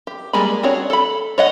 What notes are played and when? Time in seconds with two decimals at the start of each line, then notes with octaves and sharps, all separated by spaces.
0.07 G4
0.33 G3 G#3 A#3 G#4 B5
0.63 C4 D4 F#4 G#4 C#5
0.90 A4 B5
1.38 C#5 D#5 F#5